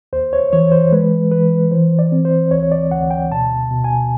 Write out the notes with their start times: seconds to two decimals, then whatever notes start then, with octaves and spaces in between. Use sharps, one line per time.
0.13 D#2 C5
0.33 C#5
0.53 E3 C#5
0.72 C5
0.92 G#3 B4
1.31 E3 B4
1.71 E3 C5
1.99 D5
2.12 C4
2.25 C5
2.51 D2 C#5
2.63 C#5
2.72 D5
2.91 D2 F#5
3.11 G5
3.31 B2 A5
3.71 B2
3.84 G#5